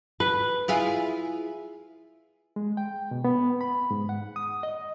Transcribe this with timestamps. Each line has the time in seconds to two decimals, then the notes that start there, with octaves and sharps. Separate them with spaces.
0.20 B4
0.68 E4 F4 G#4
2.56 G#3
2.77 G5
3.11 B2
3.24 B3
3.61 B5
3.91 G#2
4.09 F#5
4.36 D#6
4.63 D#5